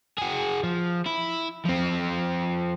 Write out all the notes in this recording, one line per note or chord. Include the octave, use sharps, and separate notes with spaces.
F#4 G#4
F3
E4
F3 C4